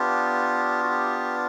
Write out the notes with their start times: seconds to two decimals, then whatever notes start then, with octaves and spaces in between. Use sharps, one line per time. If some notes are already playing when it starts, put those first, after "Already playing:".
Already playing: B3 D4 F4 G4
0.83 F#4
0.90 G4